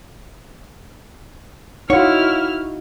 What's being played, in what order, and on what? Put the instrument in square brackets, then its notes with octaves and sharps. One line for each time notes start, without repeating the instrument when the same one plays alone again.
[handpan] D#4 [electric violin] E4 F6 [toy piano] F#4 F5 F#5 [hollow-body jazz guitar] C#5